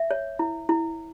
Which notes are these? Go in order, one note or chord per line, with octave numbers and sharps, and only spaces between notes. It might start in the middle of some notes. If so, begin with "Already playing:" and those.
Already playing: E5
C#5
E4
E4